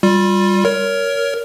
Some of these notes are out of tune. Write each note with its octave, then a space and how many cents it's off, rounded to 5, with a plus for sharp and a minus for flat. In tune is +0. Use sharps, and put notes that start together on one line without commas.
G3 +0 F4 +20
A#4 +0 C#5 +20